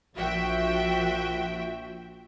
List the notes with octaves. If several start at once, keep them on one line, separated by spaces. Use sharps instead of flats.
A#1 F3 F#4 E5 G5